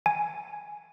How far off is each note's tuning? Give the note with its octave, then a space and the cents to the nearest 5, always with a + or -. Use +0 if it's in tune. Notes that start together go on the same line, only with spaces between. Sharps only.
G#5 +0